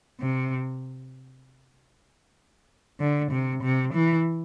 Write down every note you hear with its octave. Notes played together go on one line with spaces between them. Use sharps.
C3
D3
C3
C3
E3